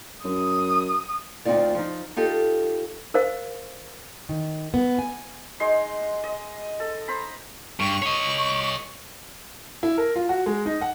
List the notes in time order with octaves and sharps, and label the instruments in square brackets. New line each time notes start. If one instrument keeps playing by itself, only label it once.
[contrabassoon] F#2 [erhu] D#6
[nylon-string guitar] D2 C4 D#4 F4 D5
F3 D#4
D#4 F4 G4 A4
[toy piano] A#4 C5 D#5 F5
[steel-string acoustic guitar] D#3
B3
G#5
[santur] G#3 D#4 C6
D#5
A4
C5 A#5 B5
[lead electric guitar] G2 [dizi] C#6
[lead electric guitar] C#5 D#5
[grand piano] E4
A#4
F4
F#4
G#3
D#4
F#5